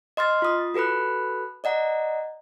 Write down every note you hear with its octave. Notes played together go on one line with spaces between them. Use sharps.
D#5 C6 F6 A6 C7
F4 D#6
F#4 A4 B4 B5 F#6
D5 D#5 F#5 A#5